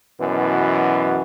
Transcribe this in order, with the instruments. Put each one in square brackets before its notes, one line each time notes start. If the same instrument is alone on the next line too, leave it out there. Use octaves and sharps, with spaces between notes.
[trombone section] F#2 B2 E3